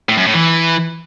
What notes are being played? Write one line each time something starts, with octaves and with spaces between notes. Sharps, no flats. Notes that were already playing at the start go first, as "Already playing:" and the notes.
A2
F#2
A2
E3